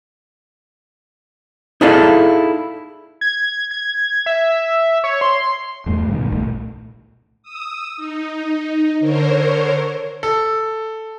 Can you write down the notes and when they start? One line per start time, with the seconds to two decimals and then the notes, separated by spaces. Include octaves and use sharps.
1.81 D#4 E4 G#4 A4 D5 F5
3.21 G#6
3.71 G#6
4.26 E5
5.04 C#5
5.21 C6
5.86 E2 G2 A3
6.08 C#2 G2 B2 D#3
6.32 B1 A#2 A3
7.43 D#6 E6
7.97 D#4
9.00 D3 A#4 C5 C#5
10.23 A4